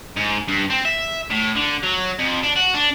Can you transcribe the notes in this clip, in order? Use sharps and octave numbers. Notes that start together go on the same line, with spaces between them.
G#2
G2
C4
E5
A2
D3
F#3
F2
D4
F#4
D4